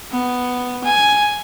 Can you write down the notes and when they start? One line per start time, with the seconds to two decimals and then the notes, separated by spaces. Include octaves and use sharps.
0.12 B3
0.84 G#5